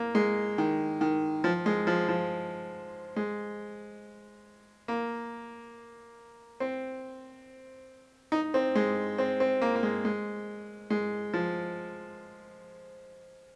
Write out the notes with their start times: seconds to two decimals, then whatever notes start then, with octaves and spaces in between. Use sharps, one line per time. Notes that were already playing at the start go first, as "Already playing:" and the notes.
Already playing: A#3
0.15 G#3
0.58 D#3
1.01 D#3
1.44 F3
1.66 G#3
1.87 F3
2.09 F3
3.16 G#3
4.88 A#3
6.60 C4
8.32 D#4
8.54 C4
8.75 G#3
9.18 C4
9.40 C4
9.62 A#3
9.76 A#3
9.83 G#3
10.05 G#3
10.90 G#3
11.34 F3